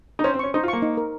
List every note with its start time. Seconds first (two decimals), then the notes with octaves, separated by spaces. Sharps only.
0.19 D#4
0.24 C#4 C5
0.34 C4
0.39 C#4 C#6
0.54 D#4 C5
0.63 F4
0.68 A#3 C#6
0.82 D#4
0.97 A#4